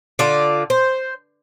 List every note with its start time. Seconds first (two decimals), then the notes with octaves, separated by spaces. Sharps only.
0.19 D3 F4 D5
0.70 C5